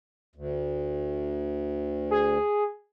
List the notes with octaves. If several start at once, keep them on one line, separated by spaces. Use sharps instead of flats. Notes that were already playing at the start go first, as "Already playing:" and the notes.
D2
G#4